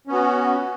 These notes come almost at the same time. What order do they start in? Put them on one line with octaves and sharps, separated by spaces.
C#4 B3 F#4